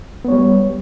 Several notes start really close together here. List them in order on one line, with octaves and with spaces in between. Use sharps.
B3 C#5 G3